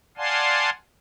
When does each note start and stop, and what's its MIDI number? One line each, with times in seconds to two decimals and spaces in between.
0.18 0.70 74
0.18 0.70 77
0.18 0.70 78
0.18 0.70 80
0.18 0.70 81
0.18 0.70 84